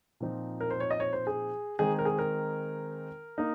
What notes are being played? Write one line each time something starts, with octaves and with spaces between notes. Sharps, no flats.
A#2 F3 C4 D#4
A#4
C5
C#5
D#5
C#5
C5
G#4
D#3 G#3 C4 D#4 G#4
A#4
G#4
A#4
A#3 D#4